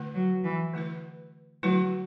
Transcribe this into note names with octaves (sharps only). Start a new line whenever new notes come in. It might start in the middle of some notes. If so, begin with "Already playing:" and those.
Already playing: D3 A3 E4 B4
F#3
E3
D3 A3 E4 B4
D3 F#3 A3 E4 B4